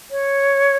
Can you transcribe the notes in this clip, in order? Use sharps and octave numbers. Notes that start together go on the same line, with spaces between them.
C#5